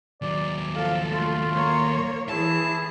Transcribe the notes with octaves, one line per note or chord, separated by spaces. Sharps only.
D#2 F#3 D5
F3 A4 F5
A3 F4
A#3 C#5
E3 E4 G#4 A5